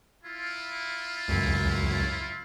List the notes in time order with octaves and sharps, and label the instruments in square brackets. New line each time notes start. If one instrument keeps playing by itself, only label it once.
[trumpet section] E4 F4
[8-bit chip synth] C#2 F#2